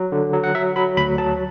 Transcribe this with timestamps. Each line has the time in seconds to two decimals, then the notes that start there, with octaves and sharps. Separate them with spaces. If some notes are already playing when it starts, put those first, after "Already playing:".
Already playing: F#3
0.12 D3
0.33 F#3
0.44 F#5
0.55 F#3 E5
0.76 F#3 B5
0.97 D2 B5
1.18 F#3 A5